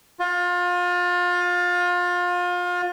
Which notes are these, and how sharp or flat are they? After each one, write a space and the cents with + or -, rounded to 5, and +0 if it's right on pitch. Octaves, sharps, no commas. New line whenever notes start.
F4 +30